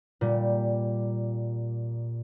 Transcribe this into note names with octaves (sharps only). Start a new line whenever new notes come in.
A#2 G3